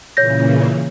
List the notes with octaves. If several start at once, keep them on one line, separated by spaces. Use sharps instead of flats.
A#2 C#3 E3 C#5 G6 A#6